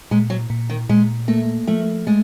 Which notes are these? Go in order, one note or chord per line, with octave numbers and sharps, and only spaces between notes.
A#2 G#3
F#3
A#2
D#3
A#2 G#3
A3 A#3
F3 A3
G#3 A3